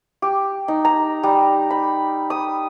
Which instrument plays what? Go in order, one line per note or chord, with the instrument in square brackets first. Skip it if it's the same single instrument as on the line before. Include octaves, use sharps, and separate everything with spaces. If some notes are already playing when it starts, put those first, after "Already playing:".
[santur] G4
D#4
A#5
G3
B5
D#6